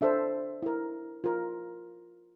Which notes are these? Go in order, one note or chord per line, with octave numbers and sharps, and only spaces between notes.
D4 A4 C5 E5
E4 A#4
F4 A#4